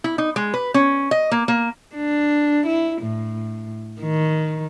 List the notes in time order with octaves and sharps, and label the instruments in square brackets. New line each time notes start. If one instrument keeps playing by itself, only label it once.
[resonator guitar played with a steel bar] E4
D#4
G#3
B4
C#4
D#5
A#3
A#3
[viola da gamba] D4
E4
A2
D#3